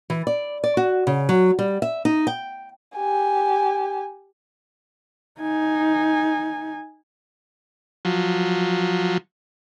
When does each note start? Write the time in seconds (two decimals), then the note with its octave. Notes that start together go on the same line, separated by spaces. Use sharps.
0.10 E3
0.27 D5
0.64 D5
0.77 F#4
1.07 C#3
1.29 F#3
1.59 G3
1.82 E5
2.05 D#4
2.27 G5
2.96 G4 G#5
5.41 D#4 G#5
8.05 F3 F#3